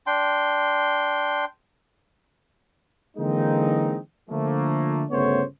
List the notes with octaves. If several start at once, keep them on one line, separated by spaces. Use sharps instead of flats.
D4 G5 C6
D3 E3 G#3 A#3 C4 D#4
D3 F3 A3 A#3
G1 C#3 A3 B3 C5 C#5